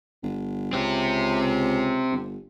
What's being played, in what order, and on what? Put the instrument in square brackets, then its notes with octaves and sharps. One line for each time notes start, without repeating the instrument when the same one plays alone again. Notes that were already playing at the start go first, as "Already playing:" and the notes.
[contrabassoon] G1
[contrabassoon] C#2 [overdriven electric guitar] C4 G4
[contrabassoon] G1